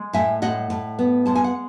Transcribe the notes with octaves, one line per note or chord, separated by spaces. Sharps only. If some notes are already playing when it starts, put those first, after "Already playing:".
Already playing: G#3
A2 E5 G#5
A2 D#5 F#5
A2
B3
G#3 A5
G#5
F#5